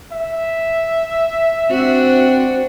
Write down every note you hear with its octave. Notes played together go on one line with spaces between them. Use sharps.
E5
C4 D4 F#4